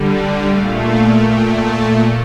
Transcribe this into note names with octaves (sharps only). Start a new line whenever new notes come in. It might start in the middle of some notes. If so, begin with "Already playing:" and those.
Already playing: D3 G3
D5
A#2 A3 F5
F5
A#2 A3 G5
A5